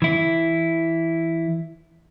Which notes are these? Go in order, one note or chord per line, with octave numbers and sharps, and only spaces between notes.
E3 E4